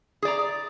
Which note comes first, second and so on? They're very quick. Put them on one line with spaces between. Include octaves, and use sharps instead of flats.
G#4 D5 A#5